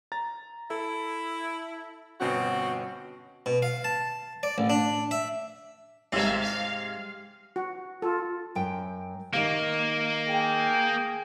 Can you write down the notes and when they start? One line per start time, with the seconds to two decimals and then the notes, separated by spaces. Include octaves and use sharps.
0.12 A#5 A6
0.70 E4 A4
2.21 G1 B2 C4 C#4 F#4
3.46 B2
3.62 F5
3.84 A5
4.43 D5
4.58 A1
4.70 D4
5.11 E5
6.12 G#1 G#2 C3 E5 F5
6.40 F5
7.56 F#4
8.02 F4 A4
8.55 F#2 G5
9.33 D#3 A#3 G4 F5
10.28 G#4 G5